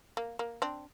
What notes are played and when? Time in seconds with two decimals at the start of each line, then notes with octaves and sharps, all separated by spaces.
0.17 A#3
0.39 A#3
0.62 C4 D4